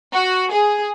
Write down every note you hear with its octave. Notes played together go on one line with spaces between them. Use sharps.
F#4
G#4